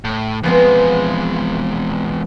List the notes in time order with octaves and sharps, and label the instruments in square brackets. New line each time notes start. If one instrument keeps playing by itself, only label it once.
[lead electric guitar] A2
[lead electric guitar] E2 G#3 [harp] F3 B3 C4